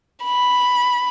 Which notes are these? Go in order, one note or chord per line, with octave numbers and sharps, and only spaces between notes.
B5